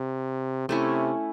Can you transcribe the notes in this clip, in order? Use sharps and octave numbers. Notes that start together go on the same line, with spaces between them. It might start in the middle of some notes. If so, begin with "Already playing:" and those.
Already playing: C3
C3 A3 C#4 E4